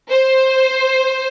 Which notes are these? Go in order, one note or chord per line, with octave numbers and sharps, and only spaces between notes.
C5